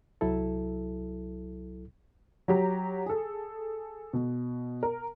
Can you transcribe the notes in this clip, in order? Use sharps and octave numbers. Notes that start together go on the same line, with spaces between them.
C2 F#3 E4 A4
F#3 G4 A#5
G#4 A4
B2
A#4